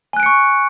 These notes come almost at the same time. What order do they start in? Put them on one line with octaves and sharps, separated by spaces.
G#5 F#6 D7 C#7 C#6